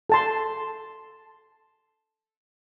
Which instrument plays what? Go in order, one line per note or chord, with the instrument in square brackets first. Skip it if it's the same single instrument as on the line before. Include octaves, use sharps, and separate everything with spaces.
[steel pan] A4 A5 C6